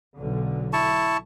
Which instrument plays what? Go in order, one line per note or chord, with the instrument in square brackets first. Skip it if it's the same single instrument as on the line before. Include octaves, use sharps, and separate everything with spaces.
[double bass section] B1 D3
[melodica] E4 A5 C#6